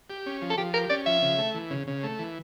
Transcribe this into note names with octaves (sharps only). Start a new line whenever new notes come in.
G4
C#4
F3
A4
F3 G4
G4 A#4
C#4 D5
F3 E5
C#3
A3
E3
C#3
C#3
A3
E3